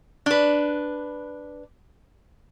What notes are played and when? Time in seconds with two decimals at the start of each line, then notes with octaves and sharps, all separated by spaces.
0.26 D4 B4